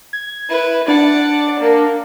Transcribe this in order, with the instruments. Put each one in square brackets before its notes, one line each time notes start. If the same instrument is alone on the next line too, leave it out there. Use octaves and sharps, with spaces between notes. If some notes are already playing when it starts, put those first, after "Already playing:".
[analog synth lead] G#6
[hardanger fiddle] E4 B4
[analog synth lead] D4 [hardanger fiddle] D5 F#5
[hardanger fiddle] A#3